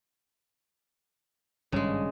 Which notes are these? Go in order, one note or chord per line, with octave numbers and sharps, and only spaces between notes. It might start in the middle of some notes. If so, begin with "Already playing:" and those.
G#1 G2 C#3 G3 G#3